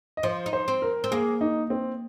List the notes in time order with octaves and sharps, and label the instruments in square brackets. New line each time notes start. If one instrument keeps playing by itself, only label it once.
[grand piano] D#5
[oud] F3 [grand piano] C5
[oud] D#4
[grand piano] C5
[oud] C4
[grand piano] A#4
[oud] C4
[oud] A#3 [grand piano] G#4
[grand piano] D#4
C4